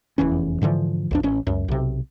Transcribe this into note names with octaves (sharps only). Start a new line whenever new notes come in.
F1 E2 E3 C#4
G#2 D3 E3 F3
A#1 E2 D4
A1 C#4
C#2 F#2
B1 C3